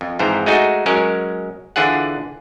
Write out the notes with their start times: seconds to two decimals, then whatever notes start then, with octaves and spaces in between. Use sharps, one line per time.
0.01 F2
0.19 F2 G#2 E3 C5 A#5
0.46 G#3 A3 D#4 F#4 G#4
0.86 F#3 G#3 C#4 A#4 C#5
1.76 D3 E3 D4 F4 G#4 F#5